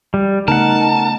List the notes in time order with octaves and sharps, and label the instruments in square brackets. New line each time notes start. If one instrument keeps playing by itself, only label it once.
[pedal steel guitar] G3
[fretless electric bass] C#3 A3 B3 [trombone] D#4 [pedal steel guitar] A#4 F#5 [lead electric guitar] A5